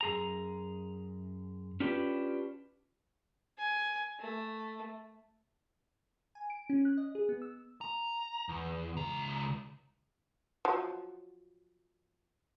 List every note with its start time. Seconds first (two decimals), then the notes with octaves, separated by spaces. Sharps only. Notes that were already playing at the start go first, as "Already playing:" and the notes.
0.01 F#2 G#4 A#5
1.80 C#4 D4 F4 G4 B4
3.58 G#5
4.20 A3
6.35 G#5
6.50 D7
6.70 C#4
6.85 F#6
6.97 D#5
7.15 G#4
7.29 B3
7.42 E6
7.81 A#5
8.49 E2
8.97 C#2 A#5
10.65 F3 F#3